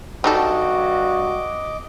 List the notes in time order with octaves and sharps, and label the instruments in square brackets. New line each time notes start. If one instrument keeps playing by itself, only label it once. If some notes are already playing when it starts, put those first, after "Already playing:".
[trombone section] G2 F#4 [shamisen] G3 D#4 A4 [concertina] D#5 D6